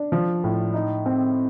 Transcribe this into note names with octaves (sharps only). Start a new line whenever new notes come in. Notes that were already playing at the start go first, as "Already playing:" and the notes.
Already playing: D4
F3
A2
D#4
C4